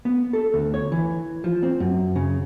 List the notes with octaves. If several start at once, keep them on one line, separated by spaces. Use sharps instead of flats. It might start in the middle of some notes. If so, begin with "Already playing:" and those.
B3
A4
D2
C#5
E3
F3
C4
F#2
C#3